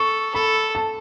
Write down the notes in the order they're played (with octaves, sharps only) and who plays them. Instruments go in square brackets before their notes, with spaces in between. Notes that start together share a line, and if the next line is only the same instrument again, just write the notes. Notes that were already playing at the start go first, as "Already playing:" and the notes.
Already playing: [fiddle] A4 [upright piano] C#6
[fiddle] A4 [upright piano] B5
[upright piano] A5